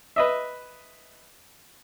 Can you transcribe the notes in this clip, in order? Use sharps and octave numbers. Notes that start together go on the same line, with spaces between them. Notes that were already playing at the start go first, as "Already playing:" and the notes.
B4 D#5 E5